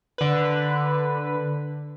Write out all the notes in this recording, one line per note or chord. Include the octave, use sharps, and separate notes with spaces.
D3 B4